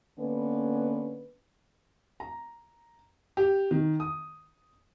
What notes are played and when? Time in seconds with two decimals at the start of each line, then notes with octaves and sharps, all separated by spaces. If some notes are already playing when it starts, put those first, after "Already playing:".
0.19 D3 A#3 B3 C#4 B4
2.20 A#5
3.37 G4
3.71 D#3
4.00 D#6